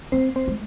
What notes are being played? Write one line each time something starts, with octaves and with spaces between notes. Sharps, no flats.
A#3 C4 C5
C4 C5
G#3